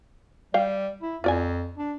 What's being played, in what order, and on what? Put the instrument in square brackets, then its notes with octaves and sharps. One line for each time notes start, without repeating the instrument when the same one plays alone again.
[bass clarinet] G3 [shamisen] F5 G5
[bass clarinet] E4
[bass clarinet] F2 [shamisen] F4 D5 G#5
[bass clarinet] D4